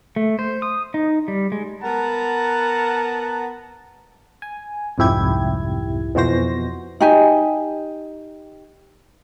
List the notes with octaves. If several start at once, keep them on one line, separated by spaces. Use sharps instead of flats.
A3
C5
D#6
D#4
G3
G#3
B3 A#4 F#5 A5 A#5
G#5
C2 F2 G#2 E4 G4 G#6
F2 B2 E3 F#4 C5 A#6
D#4 G4 G#5